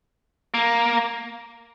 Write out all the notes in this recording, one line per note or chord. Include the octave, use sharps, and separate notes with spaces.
A#3